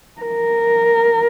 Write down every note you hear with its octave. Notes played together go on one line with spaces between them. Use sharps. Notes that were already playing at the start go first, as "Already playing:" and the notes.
A#4